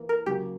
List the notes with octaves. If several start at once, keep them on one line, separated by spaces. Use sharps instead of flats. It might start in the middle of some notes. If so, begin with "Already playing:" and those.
Already playing: E3 A#3 E4
A#4
C#3 F#3 A#3 G4